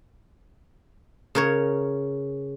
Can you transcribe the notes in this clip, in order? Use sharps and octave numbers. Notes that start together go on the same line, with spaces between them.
C#3 A#4 C#5